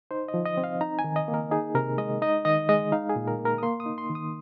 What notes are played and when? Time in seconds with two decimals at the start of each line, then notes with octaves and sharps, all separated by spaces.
0.11 D#4 C5
0.28 D#5
0.34 F3
0.45 D#5
0.57 C4
0.64 F5
0.81 D#4 A#5
0.99 G#5
1.04 D#3
1.16 D#5
1.28 A#3
1.34 A#4
1.51 D#4 G#4
1.75 C3 A#4
1.98 G#3 D#5
2.22 D#4 D#5
2.45 D#3 D#5
2.69 G#3 D#5
2.92 D#4 F5
3.09 G#4
3.16 A#2
3.28 A#4
3.39 A#3
3.45 A#4
3.58 D#6
3.63 A#3 C6
3.80 D#6
3.86 D#4
3.98 C6
4.10 D#3
4.15 D#6